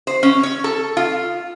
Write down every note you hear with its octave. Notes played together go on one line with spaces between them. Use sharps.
C5
C#4
C#5
A4
F4